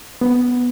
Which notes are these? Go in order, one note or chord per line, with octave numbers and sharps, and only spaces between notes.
B3